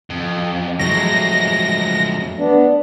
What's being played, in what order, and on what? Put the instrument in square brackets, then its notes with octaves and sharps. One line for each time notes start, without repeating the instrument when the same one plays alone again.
[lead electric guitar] F2
[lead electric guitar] F2 G#3 [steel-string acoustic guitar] F#3 A3 [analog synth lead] A#6
[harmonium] B3 D4